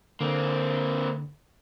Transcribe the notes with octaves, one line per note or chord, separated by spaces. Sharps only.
D3 A#3 C4